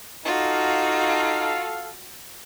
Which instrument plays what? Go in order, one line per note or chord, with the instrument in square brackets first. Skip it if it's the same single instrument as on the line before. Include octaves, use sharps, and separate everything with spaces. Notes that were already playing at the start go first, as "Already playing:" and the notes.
[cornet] D#4 [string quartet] F4 F#4 [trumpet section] A4 F5